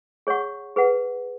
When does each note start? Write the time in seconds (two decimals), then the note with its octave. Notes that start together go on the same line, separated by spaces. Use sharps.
0.27 G#4 C#5 F#5 C#6
0.76 G#4 B4 F#5